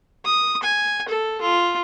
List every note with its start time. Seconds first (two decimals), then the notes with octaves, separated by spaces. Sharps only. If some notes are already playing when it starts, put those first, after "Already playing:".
0.25 D#6
0.63 G#5
1.09 A4
1.41 F4